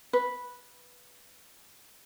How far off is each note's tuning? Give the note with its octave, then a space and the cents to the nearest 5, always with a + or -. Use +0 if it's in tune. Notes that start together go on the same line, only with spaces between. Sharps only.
B4 -10